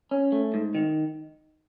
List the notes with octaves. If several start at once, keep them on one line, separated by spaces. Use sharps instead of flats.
C#4
A3
G#2
D#3